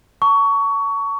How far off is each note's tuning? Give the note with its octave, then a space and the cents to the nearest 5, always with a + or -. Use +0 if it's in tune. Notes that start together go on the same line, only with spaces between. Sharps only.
A5 +45 C#6 +20